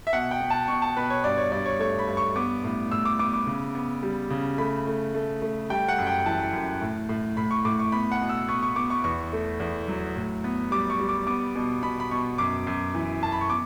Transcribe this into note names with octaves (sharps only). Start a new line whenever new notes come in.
E5
B2 F#5
G5
B2
A5
B2 C#6
A5
B2 B4
C#5
G2 D5
C#5
G2 D5
C#5
A3 C#5
B5
G2
C#6
B3 D6
A2
A2 E6
D6
B3 D6
D6
C#3
B3
G3
C#3
A3 B5
A3
A3
A3
G3 G5
F#5
F#2
G5
E3 A5
F#2
A2
A2
A2 B5
C#6
A2 D6
C#6
B3 B5
F#5
B2
E6
B3 C#6
C#6
B3 D6
C#6
E2 C#6
A3
E2
F#3
A2
B3
G3 D6
C#6
G3
D6
B3 D6
B2
B2 B5
B5
B2 C#6
F#2 D6
F#2
E3
F#2 A5
B5
C#6
B3 D6